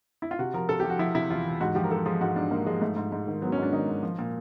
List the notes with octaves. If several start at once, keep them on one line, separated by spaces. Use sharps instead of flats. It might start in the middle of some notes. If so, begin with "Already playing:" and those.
E4
F4
C3 F#4
F3 A#4
C3 A4
G4
F3
F#4
F3 E4
C3 E4
E2 F4
E2
G#2 F#4
F3 G4
A#4
F3 A4
F3 G#4
G#2 F#4
G#2 D4
G#2 A#3
F3 G#3
G#2 A3
G#2
G#2
D#3
F#3 B3
C#4
G#2 D4
D#3 D#4
G#2
F3
A#2